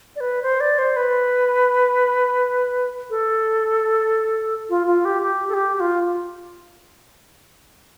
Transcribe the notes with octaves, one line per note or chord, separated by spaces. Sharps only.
D5
B4
C5
D5
C5
B4
A4
F4
F4
G4
G4
A4
G4
G4
F4